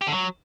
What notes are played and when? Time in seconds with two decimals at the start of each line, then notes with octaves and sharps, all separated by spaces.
0.01 G4
0.07 D3
0.12 F#3